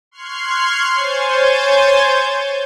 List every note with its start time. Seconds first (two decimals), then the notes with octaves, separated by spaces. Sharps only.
0.11 C6 C#6 F6 F#6 G#6 C7
0.93 C5 C#5 G#5 G6 A6